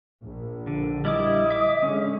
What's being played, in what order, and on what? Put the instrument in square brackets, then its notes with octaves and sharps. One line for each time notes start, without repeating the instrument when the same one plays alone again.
[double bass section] A#1
[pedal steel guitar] D3
[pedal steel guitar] G3 E4 D6 [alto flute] D#5
[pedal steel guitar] E5 D6
[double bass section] D3 G#3 [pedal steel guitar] C#4